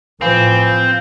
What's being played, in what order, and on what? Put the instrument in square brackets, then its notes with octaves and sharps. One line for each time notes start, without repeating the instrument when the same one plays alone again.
[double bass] A2 F3 [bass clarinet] E3 [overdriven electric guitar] C4 [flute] F5